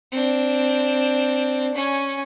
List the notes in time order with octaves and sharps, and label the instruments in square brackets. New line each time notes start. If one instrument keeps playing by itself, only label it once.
[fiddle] C4 D4
C#4 G#5